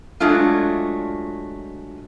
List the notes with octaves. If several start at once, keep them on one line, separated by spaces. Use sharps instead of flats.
F#3 G#3 A3 D4 F4